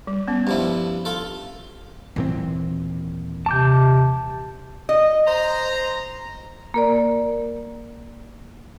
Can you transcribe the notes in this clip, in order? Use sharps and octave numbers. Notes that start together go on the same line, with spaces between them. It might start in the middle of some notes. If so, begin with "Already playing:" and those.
G3
B3 C#4
G2 F3 E4
F4 A4
D#1 A#2 E3 C4
C3 A5 D6 G6
D#5
C5 A#5
A#3 A#4 D5